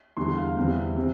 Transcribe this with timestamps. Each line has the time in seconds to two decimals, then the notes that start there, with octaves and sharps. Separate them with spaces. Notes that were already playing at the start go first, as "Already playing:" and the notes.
0.17 E2 D3 G3 C6
0.37 F5
0.57 E2 C3 G3
0.96 C3 G3